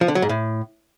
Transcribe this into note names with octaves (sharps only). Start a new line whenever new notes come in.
F3
D3
F#3
G#2
A2